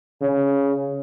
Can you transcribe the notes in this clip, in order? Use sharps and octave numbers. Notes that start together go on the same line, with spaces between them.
C#3